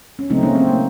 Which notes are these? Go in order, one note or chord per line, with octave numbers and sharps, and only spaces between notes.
C#4
C#3 F#3 A3 C4 D#4
A#3 C#4
C4
A#3